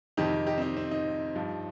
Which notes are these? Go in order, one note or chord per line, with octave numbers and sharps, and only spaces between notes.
F2 C3 D#3 D#4 G4
D#4 G4
C4
D#4
C4
D#4
G2 F3